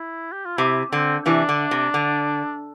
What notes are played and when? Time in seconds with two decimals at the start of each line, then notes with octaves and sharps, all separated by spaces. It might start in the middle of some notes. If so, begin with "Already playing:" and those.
Already playing: E4
0.32 G4
0.45 F4
0.57 C3 E4
0.92 D3 C4
1.26 C3 E3 D4
1.49 D3
1.71 C3
1.94 D3